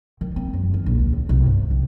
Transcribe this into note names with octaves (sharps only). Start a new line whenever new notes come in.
D#3
C4
F#2
D#3
A#1
D2
C#2
C2
G2
C3